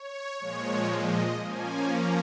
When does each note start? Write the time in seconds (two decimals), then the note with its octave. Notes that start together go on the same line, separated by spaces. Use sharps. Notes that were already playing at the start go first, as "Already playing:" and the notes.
Already playing: C#5
0.39 A#2 F3 G#3 C#5
0.90 D#5
1.41 F3 A#3 C#4 G#5
1.91 A#5